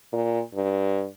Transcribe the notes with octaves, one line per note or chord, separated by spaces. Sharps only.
A#2
G2